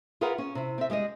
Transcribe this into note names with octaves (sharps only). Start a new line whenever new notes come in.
F4 G#4 A#4 B4 F5 F#5
C#4
C3 E4
C4 E5
G3 G#3 G#4 D#5